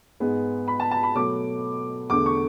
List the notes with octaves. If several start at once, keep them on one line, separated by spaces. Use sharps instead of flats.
G#2 G#3 B3
B5
A5
A5
B5
B2 F#3 A3 D6
E2 D3 A3 D6
C#6